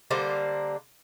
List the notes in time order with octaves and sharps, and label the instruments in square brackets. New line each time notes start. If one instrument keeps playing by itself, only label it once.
[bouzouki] D3 G3 A#3 C5